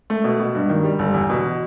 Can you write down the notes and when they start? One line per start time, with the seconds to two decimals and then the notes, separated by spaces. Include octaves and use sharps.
0.10 A3
0.24 B2
0.40 B2
0.55 G2
0.69 D#3
0.84 G3
0.99 G1
1.14 E2
1.30 B2